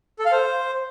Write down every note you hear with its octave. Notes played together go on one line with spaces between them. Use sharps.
A4
F5
C5